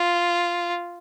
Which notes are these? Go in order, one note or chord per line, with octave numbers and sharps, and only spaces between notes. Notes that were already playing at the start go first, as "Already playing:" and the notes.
Already playing: F4